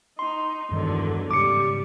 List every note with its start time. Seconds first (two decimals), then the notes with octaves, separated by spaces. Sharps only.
0.19 D#4 C6
0.71 E2 G2 D3 D#3 F#3 G#3
1.31 G#2 C#3 G3 D6 C#7